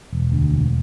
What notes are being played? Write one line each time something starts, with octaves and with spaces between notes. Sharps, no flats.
E1
D2
E1